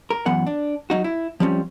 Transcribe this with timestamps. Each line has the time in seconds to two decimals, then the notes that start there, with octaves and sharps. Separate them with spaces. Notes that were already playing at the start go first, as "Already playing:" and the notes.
0.10 A#4
0.26 F#2 E3 B3 F#5
0.46 D4
0.90 F#3 D#4 F#4
1.04 E4
1.40 F3 G3 C4 C#4